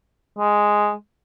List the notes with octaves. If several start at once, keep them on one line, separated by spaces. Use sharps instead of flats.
G#3